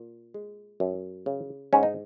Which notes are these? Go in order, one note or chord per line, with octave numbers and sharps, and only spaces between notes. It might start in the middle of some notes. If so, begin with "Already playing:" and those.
Already playing: A#2
G#3
F#2
C#3
G#2 C#4
D#4